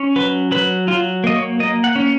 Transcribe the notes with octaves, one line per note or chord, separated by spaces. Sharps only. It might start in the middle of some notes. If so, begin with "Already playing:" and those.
Already playing: C#4
F#3 B4
F#3 B4
F#3 F4
A#3 D#5
C#5
A#3 D#5
F#5
C#4